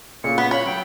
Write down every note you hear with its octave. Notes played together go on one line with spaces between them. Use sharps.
A#2 C#3 C#7
B3 B6
C#5 B5
F#3 G5